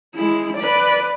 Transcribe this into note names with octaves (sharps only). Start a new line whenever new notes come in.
G#3 E4
B4 D5